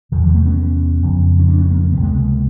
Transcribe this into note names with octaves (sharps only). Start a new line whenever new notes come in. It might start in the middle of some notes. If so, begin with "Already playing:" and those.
E2 C3 D#3
F3 G3
A3 B3
B3 C#4
F2 C#3
C#4
C4 D4
B3 C#4
A#3 C4
A#3
C#2 C3 B3
G#3 A#3